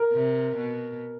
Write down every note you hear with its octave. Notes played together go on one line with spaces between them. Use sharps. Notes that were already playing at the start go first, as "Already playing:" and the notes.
Already playing: A#4
C3
B2